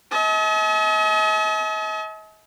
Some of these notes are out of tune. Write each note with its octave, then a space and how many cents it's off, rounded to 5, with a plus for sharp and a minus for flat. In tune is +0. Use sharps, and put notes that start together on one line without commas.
D#5 +45 A5 -45